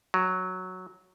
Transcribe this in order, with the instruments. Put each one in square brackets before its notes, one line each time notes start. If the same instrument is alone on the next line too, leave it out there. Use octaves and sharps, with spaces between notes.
[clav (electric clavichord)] F#3